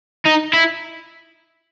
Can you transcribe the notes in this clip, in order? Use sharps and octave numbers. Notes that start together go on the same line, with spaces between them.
D#4
E4